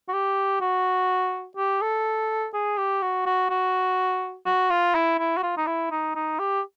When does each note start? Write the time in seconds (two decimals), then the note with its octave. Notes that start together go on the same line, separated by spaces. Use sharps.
0.08 F#4
0.13 G4
0.61 F#4
1.57 G4
1.81 A4
2.54 G#4
2.78 G4
3.02 F#4
3.26 F#4
3.50 F#4
4.46 F#4
4.70 F4
4.95 E4
5.19 E4
5.38 F#4
5.43 F4
5.57 D#4
5.67 E4
5.91 D#4
6.15 D#4
6.39 G4